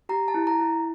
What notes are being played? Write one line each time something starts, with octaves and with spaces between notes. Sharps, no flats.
G4 A#5
A5
E4
A#5
E4